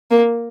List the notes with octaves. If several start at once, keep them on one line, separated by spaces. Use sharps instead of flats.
A#3